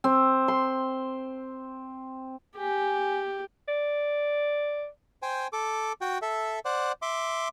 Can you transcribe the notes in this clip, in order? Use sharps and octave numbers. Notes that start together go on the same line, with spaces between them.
C4
C6
G4 G#5
D5
C5 G5 G#5
A4 D6
F#4 G5
A4 E5
C5 D5 F#5
E5 C6 D6